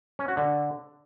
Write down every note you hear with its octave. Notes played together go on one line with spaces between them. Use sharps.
C#4
F#4
D3